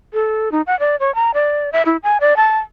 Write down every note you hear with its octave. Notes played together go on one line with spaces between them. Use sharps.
A4
D#4
F#5
D5
C#5
A#5
D5
E5
E4
G#5
D5
A5